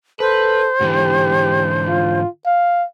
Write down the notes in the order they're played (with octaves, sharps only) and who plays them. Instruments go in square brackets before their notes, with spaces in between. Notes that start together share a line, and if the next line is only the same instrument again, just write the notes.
[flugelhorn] A4 [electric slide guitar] B4 [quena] C5
[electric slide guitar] G#2 D3 E3 [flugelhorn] G4
[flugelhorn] F4
F5